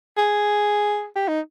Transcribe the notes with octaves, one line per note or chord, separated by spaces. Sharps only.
G#4
G4
D#4